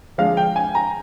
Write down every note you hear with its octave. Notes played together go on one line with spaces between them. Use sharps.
D3 F3 G#3 D4 F5
G5
G#5
A#5